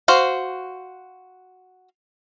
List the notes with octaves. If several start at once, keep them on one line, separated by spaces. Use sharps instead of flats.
F#4 C5 F5